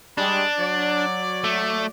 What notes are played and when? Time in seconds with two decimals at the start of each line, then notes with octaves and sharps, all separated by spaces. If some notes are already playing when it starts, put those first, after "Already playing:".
0.18 G3 G#3 D4
0.60 F#3 D5
1.44 A3